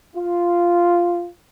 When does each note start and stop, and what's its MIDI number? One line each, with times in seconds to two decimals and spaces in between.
0.16 1.29 65